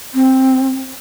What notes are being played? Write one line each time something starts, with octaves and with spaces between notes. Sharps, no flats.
C4